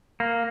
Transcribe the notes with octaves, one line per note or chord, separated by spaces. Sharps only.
A#3